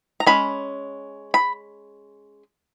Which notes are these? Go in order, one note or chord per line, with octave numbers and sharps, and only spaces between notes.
A#5
G#3 C#4 B5
B5